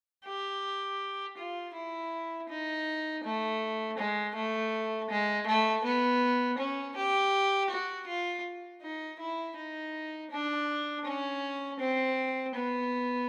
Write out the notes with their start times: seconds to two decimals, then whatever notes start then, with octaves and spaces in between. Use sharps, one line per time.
0.25 G4
1.37 F4
1.74 E4
2.49 D#4
3.24 A3
3.98 G#3
4.35 A3
5.10 G#3
5.46 A3
5.84 B3
6.58 C#4
6.96 G4
7.70 F#4
8.07 F4
8.82 D#4
9.19 E4
9.57 D#4
10.31 D4
11.05 C#4
11.79 C4
12.54 B3